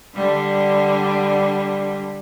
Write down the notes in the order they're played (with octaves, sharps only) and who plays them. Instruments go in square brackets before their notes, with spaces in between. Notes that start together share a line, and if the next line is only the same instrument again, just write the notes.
[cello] D3 G3